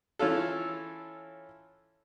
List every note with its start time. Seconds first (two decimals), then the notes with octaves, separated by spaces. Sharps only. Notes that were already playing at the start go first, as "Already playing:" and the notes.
0.19 E3 C#4 F4 A4